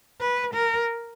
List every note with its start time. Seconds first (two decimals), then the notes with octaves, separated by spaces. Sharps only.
0.21 B4
0.54 A#4